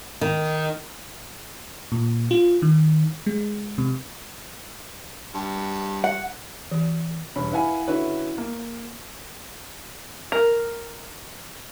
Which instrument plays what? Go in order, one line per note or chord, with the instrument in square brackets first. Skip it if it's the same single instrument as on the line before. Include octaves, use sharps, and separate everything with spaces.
[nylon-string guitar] D#3
[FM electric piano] A#2
F4
D#3
G#3
C3
[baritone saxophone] G2
[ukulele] F#5
[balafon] E3
[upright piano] E1 G2 C#4 B5
E4 B4 F5 F#5 G#5 B5
D3 C#4 E4 F#4 B4
A#3
[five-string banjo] A#4